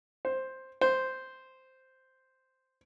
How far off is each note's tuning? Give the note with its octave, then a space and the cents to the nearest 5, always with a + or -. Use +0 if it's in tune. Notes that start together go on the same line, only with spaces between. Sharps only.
C5 +5
C5 -5